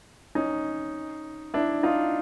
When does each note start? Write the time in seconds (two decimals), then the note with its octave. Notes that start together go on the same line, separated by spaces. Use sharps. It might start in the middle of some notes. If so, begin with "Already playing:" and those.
0.35 C#4 D#4
1.54 D4 E4
1.83 D#4 F4